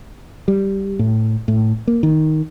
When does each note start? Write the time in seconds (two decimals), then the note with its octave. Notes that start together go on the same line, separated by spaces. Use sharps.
0.48 G3
0.99 A2
1.48 A2
1.87 A#3
2.03 D#3